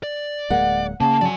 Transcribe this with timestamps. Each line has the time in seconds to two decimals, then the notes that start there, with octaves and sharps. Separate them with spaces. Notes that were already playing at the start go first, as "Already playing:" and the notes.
0.03 D5
0.50 D1 G#3 A#3 F#5
1.01 C#3 A#3 A5
1.21 F#3 D5 G#5